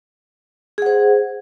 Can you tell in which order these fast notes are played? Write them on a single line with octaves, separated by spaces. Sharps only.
G#4 F#5 C5